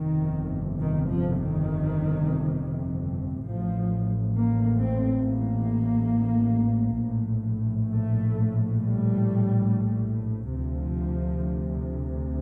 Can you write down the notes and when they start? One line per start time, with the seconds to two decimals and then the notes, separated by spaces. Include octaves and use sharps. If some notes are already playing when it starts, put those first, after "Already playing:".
Already playing: G1 F2 C3 D#3
0.80 D#3
1.09 F3
1.39 D#3
3.45 A1 A2 F3
4.34 A#3
4.78 C4
5.23 A#3
7.00 A#1 A2
7.89 A3
8.77 G3
10.54 D2 C3 F3